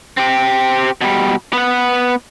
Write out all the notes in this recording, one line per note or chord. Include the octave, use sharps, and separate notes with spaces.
C4 G4
B2 G3
B3 F#5